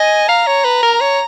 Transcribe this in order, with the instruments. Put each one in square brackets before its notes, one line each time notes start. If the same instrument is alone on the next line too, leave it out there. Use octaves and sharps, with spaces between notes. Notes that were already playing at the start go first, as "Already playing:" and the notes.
Already playing: [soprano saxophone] D#5 [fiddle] G#5
[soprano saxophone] F5 [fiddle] A#5
[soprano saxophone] C#5
B4
A#4
C#5